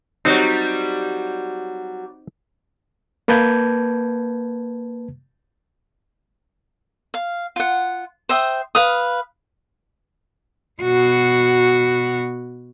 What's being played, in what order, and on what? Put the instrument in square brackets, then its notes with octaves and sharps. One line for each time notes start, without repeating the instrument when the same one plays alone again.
[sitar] F#3 G3 [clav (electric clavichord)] C4 D#4 F#4
[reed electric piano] A#3 B4 A5 G6 G#6
[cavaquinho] F5
F4 F#5
C5 E5 G5 D#6
B4 F5 D#6
[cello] B2 F#4